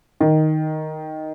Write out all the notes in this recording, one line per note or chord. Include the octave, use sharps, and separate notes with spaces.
D#3